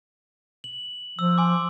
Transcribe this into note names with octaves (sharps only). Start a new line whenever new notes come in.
F#7
F3 E6
G#5 C6 D6